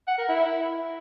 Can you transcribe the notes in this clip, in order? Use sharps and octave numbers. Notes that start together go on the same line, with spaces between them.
F#5
A#4
E4